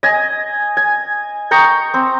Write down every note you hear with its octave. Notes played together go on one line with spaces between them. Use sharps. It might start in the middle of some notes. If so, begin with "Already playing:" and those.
D#5 G#5
G#5
G5 A#5 C#6 D#6
C4